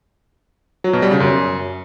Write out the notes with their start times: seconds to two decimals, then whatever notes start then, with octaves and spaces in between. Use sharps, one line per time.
0.84 F#3
0.93 B2
1.02 G3
1.11 C#3
1.20 F#2